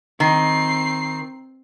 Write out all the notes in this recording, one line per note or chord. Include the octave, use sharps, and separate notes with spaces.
D#3 C4 C7